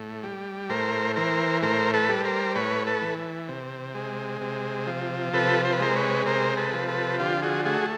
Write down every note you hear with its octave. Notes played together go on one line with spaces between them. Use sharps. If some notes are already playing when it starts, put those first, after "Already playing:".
Already playing: A2
G3
A2 A#4 C5
E3 A#4 C5
A2 A#4 C5
A4 B4
G3
A#4 C5
A2 B4 C#5
A4 B4
E3
C3
G#3
C3
F3
C3 A4 B4
C5
B4
G#3 A#4 C5
B4 C#5
C3 A#4 C5
A4 B4
F3
A4 B4
D3 F4 G4
F#4 G#4
A3 F#4 G#4